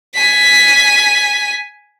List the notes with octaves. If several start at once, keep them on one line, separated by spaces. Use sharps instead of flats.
G#5 B6